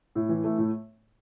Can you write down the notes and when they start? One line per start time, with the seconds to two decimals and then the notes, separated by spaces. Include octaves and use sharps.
0.15 A2
0.29 E3
0.44 A3
0.58 A2